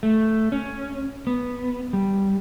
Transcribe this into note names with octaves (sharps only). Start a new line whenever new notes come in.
A3
C#4
B3
G3